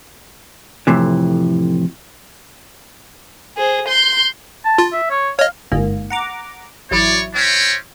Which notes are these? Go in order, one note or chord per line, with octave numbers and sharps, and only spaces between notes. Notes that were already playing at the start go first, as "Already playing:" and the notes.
F2 A2 C3 E3
G#4 C5
C6 G6
A5
F4
E5
C#5
C#5 D#5 F5
G1 G#2 A#3
F#5 A#5 D6
A1 F#3 E4 C#5 D5
C4 C#4